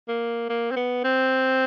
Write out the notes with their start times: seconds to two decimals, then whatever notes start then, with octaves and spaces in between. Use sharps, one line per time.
0.08 A#3
0.49 A#3
0.71 C4
0.77 B3
1.04 C4